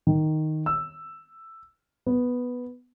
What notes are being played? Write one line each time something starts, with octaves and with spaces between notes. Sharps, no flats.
D#3
E6
B3